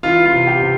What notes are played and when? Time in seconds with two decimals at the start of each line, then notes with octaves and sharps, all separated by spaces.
0.03 E3 F4
0.25 F4
0.33 C3
0.47 G4
0.62 C3